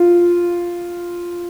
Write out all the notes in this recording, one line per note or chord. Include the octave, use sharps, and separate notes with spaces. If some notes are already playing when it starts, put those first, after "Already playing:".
Already playing: F4